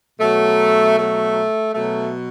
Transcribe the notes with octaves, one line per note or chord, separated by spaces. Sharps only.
B2 F#3 A3
A3
B2 F#3 A3